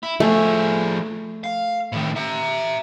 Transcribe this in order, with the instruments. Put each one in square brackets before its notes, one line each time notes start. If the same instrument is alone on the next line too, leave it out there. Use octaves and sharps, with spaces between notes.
[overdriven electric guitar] E4
[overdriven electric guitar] F3 G#4 [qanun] A3
[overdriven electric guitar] F5
A2 D#3
E5 A#5